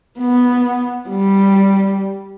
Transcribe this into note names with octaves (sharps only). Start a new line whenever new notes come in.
B3
G3